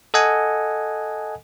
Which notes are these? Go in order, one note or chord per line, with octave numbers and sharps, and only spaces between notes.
A4 D#5 F#5 G#5